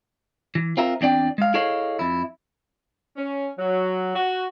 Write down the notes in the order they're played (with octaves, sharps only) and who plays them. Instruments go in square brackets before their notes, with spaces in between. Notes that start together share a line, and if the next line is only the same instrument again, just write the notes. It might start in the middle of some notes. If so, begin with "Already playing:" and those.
[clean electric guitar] E3
C4 F4 A#4 E5
E2 C4 D4 D5 G5
G#3 F5
E4 G#4 A4 C#5 D#5 F5
F2 E4
[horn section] C#4
F#3
F#4